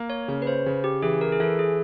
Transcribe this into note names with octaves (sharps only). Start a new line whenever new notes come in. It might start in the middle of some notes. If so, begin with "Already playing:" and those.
Already playing: A#3
C#5
C#3 C#5
B4
C5
C#3
G4
E3 G#4
A#4
G#4
E3 A4
G#4